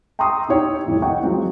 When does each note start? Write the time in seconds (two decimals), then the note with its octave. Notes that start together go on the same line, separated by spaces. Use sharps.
0.19 G5 A#5 C6 C#6 D#6 E6
0.49 D#4 G4 C#5 G5
0.86 C2 F2 A2
1.02 D#5 F#5 G5 C#6
1.23 F3 F#3 G#3 C4